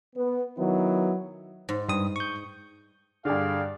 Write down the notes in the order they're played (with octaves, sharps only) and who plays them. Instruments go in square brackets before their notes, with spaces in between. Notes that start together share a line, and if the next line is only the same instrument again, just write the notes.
[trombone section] B3
D#3 F#3 B3 E4
[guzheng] G#2
[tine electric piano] G2 D#6
C#6 G6
[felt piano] G2 D3 [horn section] G#4 D5 F5